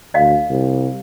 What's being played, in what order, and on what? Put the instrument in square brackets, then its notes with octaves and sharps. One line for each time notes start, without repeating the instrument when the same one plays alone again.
[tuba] D2 [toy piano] D#5 F5
[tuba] C2